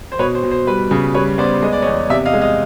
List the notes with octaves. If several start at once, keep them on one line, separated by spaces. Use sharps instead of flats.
C5
B2 B4 C#5
C5
B2
C5
G3 B4
C#3
G3 B4 C#5
B3 C5 D5
G#3 D#5
D5
C#5 D#5
E2
C3 D5 E5
D#5 F5
G#3
D#5 F5